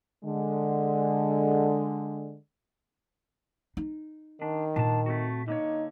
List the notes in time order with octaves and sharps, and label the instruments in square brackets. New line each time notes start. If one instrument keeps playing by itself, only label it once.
[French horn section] D3 G#3
[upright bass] D#4
[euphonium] D#3 [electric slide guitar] D4
[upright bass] A#2 [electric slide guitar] D4 A5
[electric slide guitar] A3 C4 F#4
[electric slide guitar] D3 A#3 C#5 [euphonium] D#4